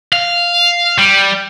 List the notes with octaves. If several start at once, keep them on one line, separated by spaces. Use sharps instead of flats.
F5
G3